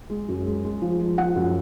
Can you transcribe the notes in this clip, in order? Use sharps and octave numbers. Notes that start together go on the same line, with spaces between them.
G#3
F#2
G#3
G#3
F3
G#3
F3 F#5
F#2